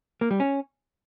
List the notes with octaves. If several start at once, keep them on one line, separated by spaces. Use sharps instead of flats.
A#3
G3
C#4